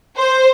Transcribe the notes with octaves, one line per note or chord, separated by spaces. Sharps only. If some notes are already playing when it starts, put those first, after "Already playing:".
C5